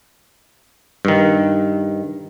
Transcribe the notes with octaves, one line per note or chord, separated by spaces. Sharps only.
G2 D#3